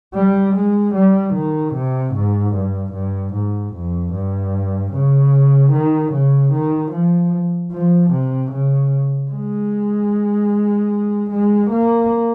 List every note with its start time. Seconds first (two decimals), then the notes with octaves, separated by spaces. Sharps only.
0.14 G3
0.54 G#3
0.95 G3
1.34 D#3
1.74 C3
2.14 G#2
2.54 G2
2.93 G2
3.34 G#2
3.74 F2
4.13 G2
4.92 C#3
5.72 D#3
6.12 C#3
6.53 D#3
6.92 F3
7.71 F3
8.11 C3
8.52 C#3
9.31 G#3
11.30 G#3
11.70 A#3